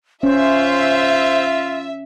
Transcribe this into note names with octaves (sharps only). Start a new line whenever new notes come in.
C#4 F4 C5 E5